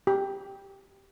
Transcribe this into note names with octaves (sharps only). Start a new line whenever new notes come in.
G4